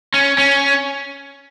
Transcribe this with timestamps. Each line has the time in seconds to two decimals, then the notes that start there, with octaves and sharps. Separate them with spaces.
0.14 C#4
0.38 C#4